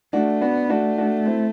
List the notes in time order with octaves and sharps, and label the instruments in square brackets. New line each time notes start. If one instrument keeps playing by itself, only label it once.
[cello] A3 [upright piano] D4 F#4
[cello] B3 [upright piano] D4 F#4
[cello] A3 [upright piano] D4 F#4
[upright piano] D4 F#4
C4 E4